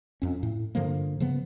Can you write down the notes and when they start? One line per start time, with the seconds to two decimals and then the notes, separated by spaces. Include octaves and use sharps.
0.22 F2 C#4
0.43 A2
0.75 G2 D3 F3 A#3
1.20 C#3 F3 A#3 B3